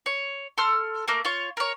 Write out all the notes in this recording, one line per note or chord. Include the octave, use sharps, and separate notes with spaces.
C#5
A4 C6 F6
A3 A#3 A#4
F4 C#5
A#4 C#5